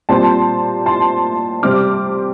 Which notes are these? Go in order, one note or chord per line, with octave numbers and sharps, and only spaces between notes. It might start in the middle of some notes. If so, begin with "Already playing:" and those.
A#2 G3 C4 A5 C6
A5 C6
C3 G3 C4 D6 F6